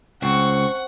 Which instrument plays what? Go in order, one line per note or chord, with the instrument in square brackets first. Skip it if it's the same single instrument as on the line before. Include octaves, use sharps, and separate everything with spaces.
[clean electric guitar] C#2 [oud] C4 [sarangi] F#5 [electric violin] C#6